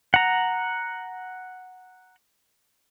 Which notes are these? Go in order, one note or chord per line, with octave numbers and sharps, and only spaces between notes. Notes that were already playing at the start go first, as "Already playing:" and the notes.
F#5 A#5